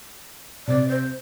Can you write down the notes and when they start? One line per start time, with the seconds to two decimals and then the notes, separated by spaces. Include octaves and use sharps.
0.67 C3 D5
0.88 C5